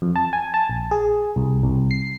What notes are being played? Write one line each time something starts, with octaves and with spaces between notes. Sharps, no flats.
F2
A5
G#5
A5
A#1
G#4
C2
C2
C7